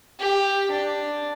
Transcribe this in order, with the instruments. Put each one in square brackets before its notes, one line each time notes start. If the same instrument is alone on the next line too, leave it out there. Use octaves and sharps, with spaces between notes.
[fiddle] G4
D4